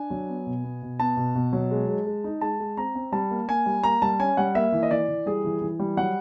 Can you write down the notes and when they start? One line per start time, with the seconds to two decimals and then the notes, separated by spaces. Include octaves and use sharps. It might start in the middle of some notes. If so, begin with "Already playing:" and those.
Already playing: D4 G#5
0.10 F#3
0.28 B3
0.46 B2
0.64 B3
0.82 B2
1.00 B3 A5
1.17 B2
1.35 B2
1.53 F#3
1.71 G#3
1.88 G#3
2.07 G#3
2.24 D#4
2.41 G#3 A5
2.60 G#3
2.77 C4 A#5
2.95 C4
3.12 G3 A5
3.31 A#3
3.48 A#3 G#5
3.66 G3
3.83 A#3 A#5
4.02 G3 A5
4.20 C#4 G#5
4.37 G3 F#5
4.55 A#3 E5
4.72 E3
4.83 D#5
4.90 E3 D5
5.08 E3
5.26 G3 G#4
5.44 E3
5.61 E3
5.79 G3
5.97 F#3 F#5